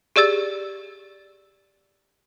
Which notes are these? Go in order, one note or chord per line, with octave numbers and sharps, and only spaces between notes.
G4 G#4 D5 E6 A6